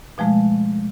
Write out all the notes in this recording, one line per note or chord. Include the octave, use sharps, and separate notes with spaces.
B2 F3 G#3 A3